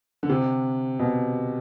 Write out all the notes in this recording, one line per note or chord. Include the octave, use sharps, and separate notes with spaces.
D3
C3
B2